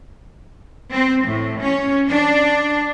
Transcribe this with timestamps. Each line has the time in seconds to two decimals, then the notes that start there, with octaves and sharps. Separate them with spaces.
0.91 C4
1.27 A2
1.60 C#4
2.10 D4